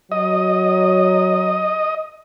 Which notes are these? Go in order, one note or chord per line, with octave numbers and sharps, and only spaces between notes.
F#3 D#5